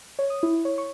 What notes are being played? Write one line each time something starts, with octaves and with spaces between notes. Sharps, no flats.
C#5
D#6
E4
C#5
C#6